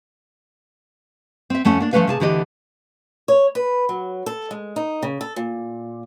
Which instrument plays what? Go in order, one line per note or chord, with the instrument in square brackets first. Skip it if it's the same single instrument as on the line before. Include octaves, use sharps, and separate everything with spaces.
[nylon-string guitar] C4 E5
F2 A3 C#4 F#5
A#3 D4
F3 F#3 A3 C#4 B4 F5
C3 G#4 A5
D2 D3 E3 G4 D#5
[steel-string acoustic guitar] C#5
B4
F#3
A4
G#3
D#4
C#3
A4
A#2